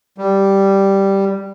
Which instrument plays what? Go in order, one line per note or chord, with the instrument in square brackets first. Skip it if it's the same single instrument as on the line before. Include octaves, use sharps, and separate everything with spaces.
[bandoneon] G3